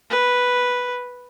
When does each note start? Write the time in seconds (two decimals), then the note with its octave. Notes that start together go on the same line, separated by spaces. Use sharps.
0.10 B4